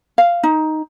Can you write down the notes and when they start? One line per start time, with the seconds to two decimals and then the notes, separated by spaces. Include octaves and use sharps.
0.18 F5
0.43 D#4